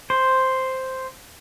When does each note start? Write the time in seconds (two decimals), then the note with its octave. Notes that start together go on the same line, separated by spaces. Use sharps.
0.10 C5